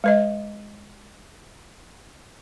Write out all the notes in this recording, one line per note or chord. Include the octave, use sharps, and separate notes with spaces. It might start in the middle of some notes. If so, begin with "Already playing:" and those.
G#3 B4 D#5